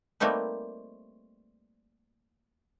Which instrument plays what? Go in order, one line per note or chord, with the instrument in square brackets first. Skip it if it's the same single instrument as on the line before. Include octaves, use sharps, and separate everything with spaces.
[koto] G3 A3 A#3 C4 D#4 B4